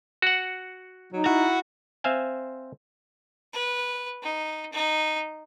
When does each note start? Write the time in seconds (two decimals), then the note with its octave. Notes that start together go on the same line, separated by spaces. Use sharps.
0.22 F#4 F#5
1.13 F#3 D#4
1.26 E4 F#4
2.04 C4 C5 E5 F5 G#5
3.53 B4
4.23 D#4
4.73 D#4